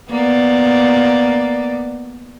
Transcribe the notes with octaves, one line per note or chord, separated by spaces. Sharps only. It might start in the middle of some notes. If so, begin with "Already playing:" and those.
A#3 B3 D5